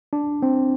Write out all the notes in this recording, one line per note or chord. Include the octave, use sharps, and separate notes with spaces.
D4
C4